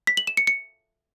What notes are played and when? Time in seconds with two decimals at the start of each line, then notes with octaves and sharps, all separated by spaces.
0.07 B6
0.17 F#7
0.27 E7
0.37 C#7
0.47 C#7